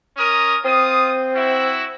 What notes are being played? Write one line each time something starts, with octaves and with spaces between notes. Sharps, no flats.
C#4 A#4 D#6
C4 F4 D#6
E4 F#4 E5